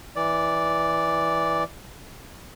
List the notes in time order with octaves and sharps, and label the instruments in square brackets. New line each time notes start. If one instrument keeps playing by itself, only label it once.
[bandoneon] E3 D5